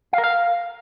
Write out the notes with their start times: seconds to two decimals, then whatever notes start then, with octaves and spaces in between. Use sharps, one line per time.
0.13 F5
0.18 A#4
0.24 F5